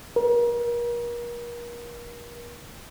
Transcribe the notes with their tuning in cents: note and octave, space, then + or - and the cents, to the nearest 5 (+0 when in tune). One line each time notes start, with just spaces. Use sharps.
A#4 +35